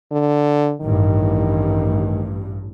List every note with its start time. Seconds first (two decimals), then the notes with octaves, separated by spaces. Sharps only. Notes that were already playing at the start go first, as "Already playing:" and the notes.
0.12 D3
0.81 A1 G2 D#3